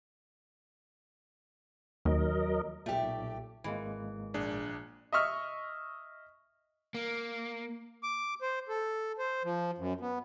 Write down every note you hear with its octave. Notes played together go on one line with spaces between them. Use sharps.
D#2 F#3 A#4 D#5
B1 A#2 A3 G4
G#1 E3 G#3 A#3
A#1 D4 G#4
D#5 E5 C#6 F6
A#3
D6
C5
A4
C5
F3
F#2
B3